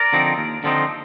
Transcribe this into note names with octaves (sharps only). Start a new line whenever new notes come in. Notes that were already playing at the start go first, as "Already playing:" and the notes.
Already playing: A#4 D5
D3 F3 C4 D#4
D#2
D3 F3 C4 D#4